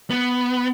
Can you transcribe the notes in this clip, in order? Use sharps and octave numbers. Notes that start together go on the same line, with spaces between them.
B3